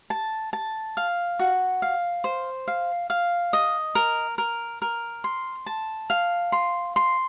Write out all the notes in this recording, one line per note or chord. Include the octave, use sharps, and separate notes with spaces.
A5
A5
F5
F#4
F5
C5
F5
F5
D#5
A#4
A#4
A#4
C6
A5
F5
C6
C6